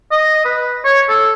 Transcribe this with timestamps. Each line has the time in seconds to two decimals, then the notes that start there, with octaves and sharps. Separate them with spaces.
0.11 D#5
0.45 B4
0.84 C#5
1.09 A4